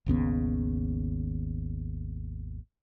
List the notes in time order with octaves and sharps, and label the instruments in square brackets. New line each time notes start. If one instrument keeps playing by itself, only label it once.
[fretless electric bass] G#1 D#2 C#3 B3